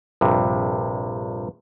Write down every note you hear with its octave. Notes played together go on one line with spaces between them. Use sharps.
A#1 G2 C3